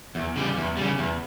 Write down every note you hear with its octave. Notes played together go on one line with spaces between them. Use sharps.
E2
C#3 G3
E2
C#3 G3
E2